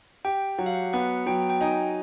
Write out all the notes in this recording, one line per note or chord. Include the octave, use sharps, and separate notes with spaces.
G4 G5
F#3 F#5
F5
F#5
B3 F#5
F#3 G5
G5
D#4 G#5